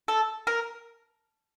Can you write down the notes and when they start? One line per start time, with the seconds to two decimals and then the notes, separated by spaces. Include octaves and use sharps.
0.08 A4
0.47 A#4